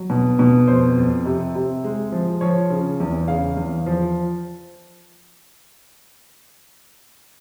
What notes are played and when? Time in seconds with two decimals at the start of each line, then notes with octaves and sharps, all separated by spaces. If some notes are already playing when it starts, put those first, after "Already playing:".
Already playing: F#3
0.10 B2
0.39 B2
0.68 F2 C5
0.97 F2
1.25 C3
1.55 C3
1.84 G#3
2.12 F3
2.41 F3 C#5
2.70 C#3
3.00 E2
3.28 C#3 F5
3.57 E2
3.86 F3